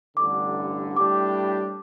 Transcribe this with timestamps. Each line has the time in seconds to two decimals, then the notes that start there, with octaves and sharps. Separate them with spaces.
0.17 A1 G2 D3 D6
0.96 A2 G3 D4 G4 D6